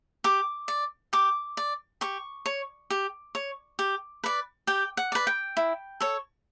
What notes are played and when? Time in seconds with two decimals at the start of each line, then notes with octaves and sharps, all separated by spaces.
0.24 G4 D6
0.68 D5
1.13 G4 D6
1.57 D5
2.01 G4 C#6
2.46 C#5
2.90 G4
3.35 C#5
3.79 G4
4.24 B4 D5
4.67 G4 G5
4.97 F#5
5.12 B4 D5
5.27 G5
5.57 E4
6.00 A4 C#5